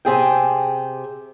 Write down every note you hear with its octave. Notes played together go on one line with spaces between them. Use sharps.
C3 G#4 G5